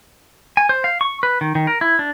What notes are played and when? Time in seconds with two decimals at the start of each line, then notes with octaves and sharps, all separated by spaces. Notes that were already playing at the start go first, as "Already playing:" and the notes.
0.57 G#5
0.69 C5
0.84 F5
1.01 C#6
1.23 B4
1.41 D#3
1.55 D#3
1.67 A#4
1.81 E4
1.99 D4